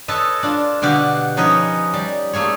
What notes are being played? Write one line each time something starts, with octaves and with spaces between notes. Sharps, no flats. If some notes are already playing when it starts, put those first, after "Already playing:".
A4 B4 C#5 D#5 G#5 A5
D4 F4
B2 D3 F#4 G4 F5
F3 C#4 D#4 B4 C#5 D#5
G3
A3 A#3 G#4 C#5